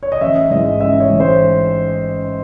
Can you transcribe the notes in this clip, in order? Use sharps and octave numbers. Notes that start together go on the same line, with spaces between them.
C#5
D#5
A1 E5
G#2 E3 G#3 D#5
A1 E5
C#5
G#2 E3 G#3
C5